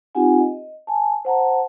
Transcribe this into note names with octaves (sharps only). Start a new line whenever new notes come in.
C4 D#4 F4 G4 F#5 G#5
D#5
G#5 A5
C5 F#5 A5 A#5